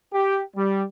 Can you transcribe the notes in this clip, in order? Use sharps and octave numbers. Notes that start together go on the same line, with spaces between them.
G4
G3